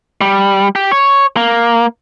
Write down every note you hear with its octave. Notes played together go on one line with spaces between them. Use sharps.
G3
G4
C#5
A#3